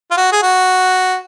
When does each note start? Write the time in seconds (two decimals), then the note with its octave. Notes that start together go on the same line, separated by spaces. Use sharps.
0.11 F4
0.17 F#4
0.32 G#4
0.43 F#4